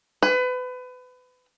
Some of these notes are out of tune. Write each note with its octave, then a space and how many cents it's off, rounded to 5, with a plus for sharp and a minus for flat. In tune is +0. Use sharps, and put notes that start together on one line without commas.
B4 +30